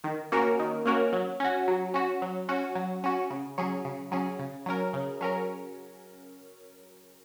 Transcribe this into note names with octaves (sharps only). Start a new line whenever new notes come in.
D#3
A#3 C#4 F#4 A#4
D#3
A#3 C#4 F#4 A#4
F#3
C#4 F#4
F#3
C#4 F#4
F#3
C#4 F#4
F#3
C#4 F#4
C#3
F#3 C#4 G#4
C#3
F#3 C#4 G#4
C#3
F#3 C#4 A#4
C#3
F#3 C#4 A#4